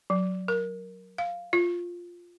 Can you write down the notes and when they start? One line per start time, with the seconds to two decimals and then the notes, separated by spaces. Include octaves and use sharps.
0.10 F#3
0.48 A#4
1.18 F5
1.53 F4